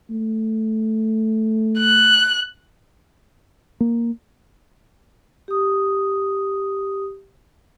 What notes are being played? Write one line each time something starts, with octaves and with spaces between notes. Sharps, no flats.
A3
F#6
A#3
G4 D#6